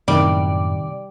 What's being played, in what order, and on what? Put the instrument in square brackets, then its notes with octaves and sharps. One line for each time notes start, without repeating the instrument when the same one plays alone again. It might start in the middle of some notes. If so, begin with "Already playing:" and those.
[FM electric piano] F#2 A2 [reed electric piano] C3 D#3 [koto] G3 [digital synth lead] D5